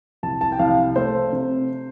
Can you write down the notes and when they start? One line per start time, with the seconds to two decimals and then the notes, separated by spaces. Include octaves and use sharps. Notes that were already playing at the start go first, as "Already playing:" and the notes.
0.23 C2 A5
0.41 A5
0.52 G5
0.59 C2 F5
0.96 A3 C5
1.33 C3